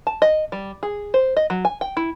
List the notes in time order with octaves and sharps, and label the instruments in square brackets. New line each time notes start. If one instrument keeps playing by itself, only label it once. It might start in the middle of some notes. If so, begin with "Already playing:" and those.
[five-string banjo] A5
D#5
G3
G#4
C5
D#5
F#3
G#5
G5
E4